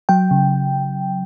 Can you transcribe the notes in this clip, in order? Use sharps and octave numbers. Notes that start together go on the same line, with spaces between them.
F#3 G5
C#3